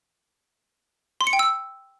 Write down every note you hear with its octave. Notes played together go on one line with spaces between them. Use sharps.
C6
C#7
G5
E6